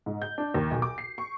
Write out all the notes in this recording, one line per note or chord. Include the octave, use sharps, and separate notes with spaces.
G#2
G6
D4
D#2
B1
D6
C7
C#6